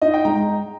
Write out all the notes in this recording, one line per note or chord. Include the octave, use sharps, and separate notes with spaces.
D#4 D#5
G5
G#3 A#5